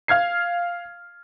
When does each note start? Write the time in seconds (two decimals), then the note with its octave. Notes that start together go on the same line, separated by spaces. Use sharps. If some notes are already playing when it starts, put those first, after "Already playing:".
0.08 F5 F6 G#6 C7